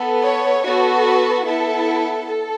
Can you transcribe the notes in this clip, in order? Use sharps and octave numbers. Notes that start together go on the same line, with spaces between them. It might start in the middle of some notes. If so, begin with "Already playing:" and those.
Already playing: B3 A4
C#5
B3 F#4 A4
B4
B3 E4 A4
A4